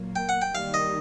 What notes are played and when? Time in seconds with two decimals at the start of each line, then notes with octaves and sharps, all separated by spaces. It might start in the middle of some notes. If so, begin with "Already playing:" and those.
Already playing: A#2 F#3 A#3
0.16 G5
0.29 F#5
0.42 G5
0.55 D#3 G3 A#3 F5
0.74 D#5